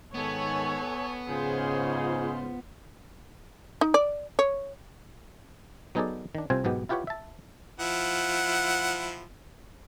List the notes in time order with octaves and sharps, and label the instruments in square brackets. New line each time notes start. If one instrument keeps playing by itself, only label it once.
[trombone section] G#2 D#3 [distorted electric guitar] B3 [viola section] A4 C#5 G#5
[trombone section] G#2 C#3 [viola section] F4 C5 [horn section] G#4
[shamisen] D#4
D5
C#5
[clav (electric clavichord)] F#3 B3 D#4 G#4 A4 D5
D#3 D4
C2 C3 C4 F4 C5 G#5
B1 G#2 B2 B3 G4
E4 F4 G4 B4 C#5 F#5
E5 A5
[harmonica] F3 E4 F#5